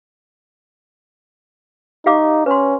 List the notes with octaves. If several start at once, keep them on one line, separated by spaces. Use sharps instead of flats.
D#4 G4 F5 D6
C#4 B4 C6